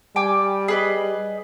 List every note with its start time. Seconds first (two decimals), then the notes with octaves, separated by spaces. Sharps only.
0.16 G3 G5 G#5 D6
0.68 G#4 B4 D#5